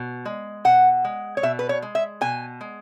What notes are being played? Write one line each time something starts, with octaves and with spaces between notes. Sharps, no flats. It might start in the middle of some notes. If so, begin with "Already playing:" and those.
Already playing: B2
G#3
B2 F#5
G#3
C#5
B2 E5
B4
C#5
G#3
E5
B2 G#5
G#3